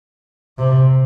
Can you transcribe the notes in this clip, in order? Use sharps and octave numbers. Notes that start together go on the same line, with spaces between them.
C3